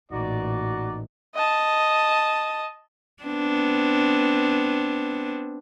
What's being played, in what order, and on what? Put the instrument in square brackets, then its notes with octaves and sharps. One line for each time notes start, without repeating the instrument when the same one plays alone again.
[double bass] A1 A#2 [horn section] D#4 F#4 D5
[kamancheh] D#5 A5
[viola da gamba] B3 C4 D4